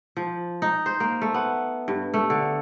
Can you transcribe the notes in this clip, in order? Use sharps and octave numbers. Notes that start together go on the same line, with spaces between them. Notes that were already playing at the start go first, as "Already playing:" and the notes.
F3
D#4
C5
A#3
A3
B3
G2
A3
D3